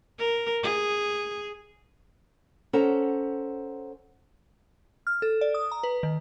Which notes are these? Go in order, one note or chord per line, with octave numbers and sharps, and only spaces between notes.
A#4
G#4
C#4 A4 C5 F#5 A#5
F6
A4
D5
D#6
A#5
B4
D#3